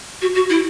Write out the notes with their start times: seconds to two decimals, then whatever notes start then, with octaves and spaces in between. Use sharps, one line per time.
0.21 F#4
0.35 F#4
0.50 E4